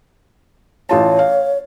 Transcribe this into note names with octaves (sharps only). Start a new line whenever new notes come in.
A1 F4 C#5 A5
F5